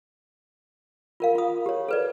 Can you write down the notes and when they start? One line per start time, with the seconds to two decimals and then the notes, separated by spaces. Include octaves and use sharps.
1.20 F4 A#4 F5
1.35 F4 D#6
1.66 G4 C#5
1.88 A4 B4 D5